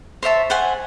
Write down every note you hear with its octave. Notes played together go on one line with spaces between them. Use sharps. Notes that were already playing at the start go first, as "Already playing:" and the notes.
C5 C#5 E5 A5
C5 F#5 G#5